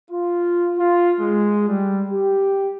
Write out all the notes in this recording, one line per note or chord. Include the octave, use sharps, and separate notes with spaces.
F4
F4
G#3
G3
G4